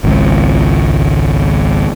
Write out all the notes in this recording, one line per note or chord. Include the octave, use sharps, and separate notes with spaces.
G#1 C#2